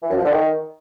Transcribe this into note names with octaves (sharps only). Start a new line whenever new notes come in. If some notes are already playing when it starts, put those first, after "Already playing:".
E3
F#2
F3
D3
D#3